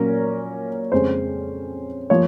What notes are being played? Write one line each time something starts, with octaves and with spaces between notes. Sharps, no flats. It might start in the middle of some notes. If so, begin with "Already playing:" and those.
Already playing: A#2 F#3 A#3 C#4 A#4
F2 C#3 G#3 C#4 C5
F3 A#3 C#5